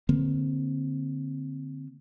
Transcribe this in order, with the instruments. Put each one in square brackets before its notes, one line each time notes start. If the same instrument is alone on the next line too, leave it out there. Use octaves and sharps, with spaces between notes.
[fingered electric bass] D3 A#3 C4